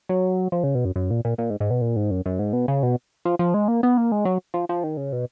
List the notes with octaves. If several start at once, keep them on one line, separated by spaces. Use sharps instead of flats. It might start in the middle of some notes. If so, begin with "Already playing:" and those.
F#3
F3
C#3
B2
F#2
F#2
A#2
A#2
A#2
G#2
G#2
B2
A#2
G#2
F#2
F#2
G#2
B2
C#3
B2
F3
F3
G#3
A#3
B3
A#3
G#3
F#3
F3
F3
D#3
C#3
B2